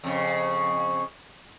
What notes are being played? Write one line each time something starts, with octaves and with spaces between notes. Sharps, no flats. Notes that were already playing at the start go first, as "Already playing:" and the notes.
F2 C#3